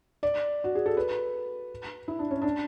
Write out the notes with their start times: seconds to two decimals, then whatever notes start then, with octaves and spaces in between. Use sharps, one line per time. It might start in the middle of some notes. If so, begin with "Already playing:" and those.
0.23 D5
0.64 F#4
0.75 G#4
0.86 A4
0.97 B4
2.08 E4
2.19 D4
2.31 C#4
2.42 D4